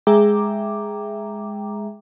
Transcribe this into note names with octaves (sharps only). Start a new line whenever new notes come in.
G#3 G#4 E5 G5 A#5 D6